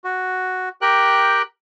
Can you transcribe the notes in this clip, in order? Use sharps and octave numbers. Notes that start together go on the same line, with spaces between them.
F#4
G4 A#4 G5 F#6